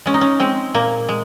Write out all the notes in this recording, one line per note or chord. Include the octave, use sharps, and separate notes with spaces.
G#3 C#4
D#4
C#4
G#3 C4
A#2 A#3
G#3